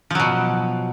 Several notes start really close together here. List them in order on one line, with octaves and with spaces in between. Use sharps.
F3 F#3 B2